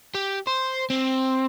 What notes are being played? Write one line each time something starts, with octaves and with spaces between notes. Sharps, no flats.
G4
C5
C4